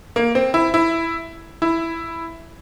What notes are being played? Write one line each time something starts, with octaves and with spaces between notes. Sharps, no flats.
A#3
C4
E4
E4
E4